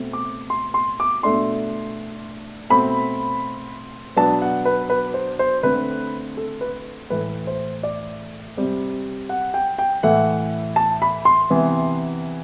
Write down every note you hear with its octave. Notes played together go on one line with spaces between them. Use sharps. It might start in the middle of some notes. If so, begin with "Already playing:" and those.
Already playing: B2 A3 C4
D6
C6
C6
D6
B2 A3 D4 C6
B2 A3 C4 B5
B2 F#3 B3 D4 A5
F#5
B4
B4
C5
C5
D3 A3 C4 B4
A4
B4
A2 E3 A3 B4
C5
D5
C3 G3 C4
F#5
G5
G5
A2 E3 A3 F#5
A5
B5
C6
C3 E3 B3